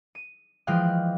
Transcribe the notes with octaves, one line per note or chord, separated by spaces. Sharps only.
D#7
E3 F3 G#3 F5 G5 F#6